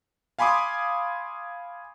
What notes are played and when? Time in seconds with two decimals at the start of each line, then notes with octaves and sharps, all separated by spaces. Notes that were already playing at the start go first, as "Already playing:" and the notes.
0.39 F5 G#5 B5 C6 D6 D#6